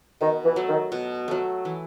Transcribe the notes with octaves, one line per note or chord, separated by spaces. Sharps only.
B2 D#3
E3
F#3 A3
D#3
B2
F#3 A3
E3